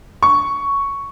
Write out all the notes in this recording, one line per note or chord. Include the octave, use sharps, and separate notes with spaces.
C#6